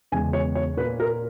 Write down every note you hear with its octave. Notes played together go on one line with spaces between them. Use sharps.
E2 C#3 G#3 G#5
C#5
C#5
A#2 A#3 B4
A#4